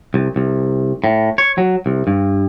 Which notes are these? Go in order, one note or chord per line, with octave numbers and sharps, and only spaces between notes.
C2
C2
A2
C#5
F#3
C2
G2